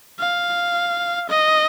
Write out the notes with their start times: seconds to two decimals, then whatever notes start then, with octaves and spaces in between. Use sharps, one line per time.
0.20 F5
1.29 D#5